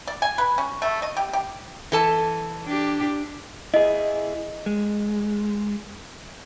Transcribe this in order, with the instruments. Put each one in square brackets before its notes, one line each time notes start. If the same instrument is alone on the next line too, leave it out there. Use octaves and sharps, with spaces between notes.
[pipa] D5
G#5
B4
C#4
A3
D#5
G4
G4
[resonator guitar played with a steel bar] E3 A4 A5
[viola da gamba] D4 G4
[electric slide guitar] E4 G#4 [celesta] D#5
[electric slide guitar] G#3